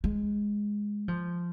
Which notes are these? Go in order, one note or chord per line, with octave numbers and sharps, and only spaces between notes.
G#3
F3